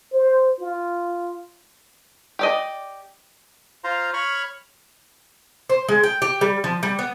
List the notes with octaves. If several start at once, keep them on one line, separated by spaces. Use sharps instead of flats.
C5
F4
G4 D5 D#5
F4 C5 F5 A#5 C6
C#5 B5 C#6 F6
C5
G#3
G5
G4
G3
F3
G3
B3